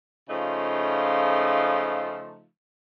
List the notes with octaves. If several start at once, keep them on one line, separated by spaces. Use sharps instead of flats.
C#3 F3 A3 D#4 F4